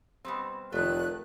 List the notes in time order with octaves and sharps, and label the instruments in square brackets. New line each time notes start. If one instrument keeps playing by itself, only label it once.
[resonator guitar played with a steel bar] B2 G3 C4
[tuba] F1 [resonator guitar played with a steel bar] D#3 A3 [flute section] F#6